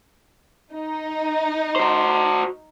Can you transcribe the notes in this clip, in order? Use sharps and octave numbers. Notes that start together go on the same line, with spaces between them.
D#4
F#4 C5